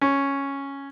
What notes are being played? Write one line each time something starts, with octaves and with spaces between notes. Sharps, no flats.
C#4